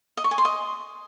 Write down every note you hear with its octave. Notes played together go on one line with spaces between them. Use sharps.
D#5
C#6
G#5
C6
D#5